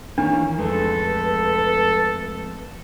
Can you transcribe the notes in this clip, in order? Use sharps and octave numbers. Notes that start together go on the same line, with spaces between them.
D#3 E3 A#3 C#4 D4
F2 G#3 A3 A4 B4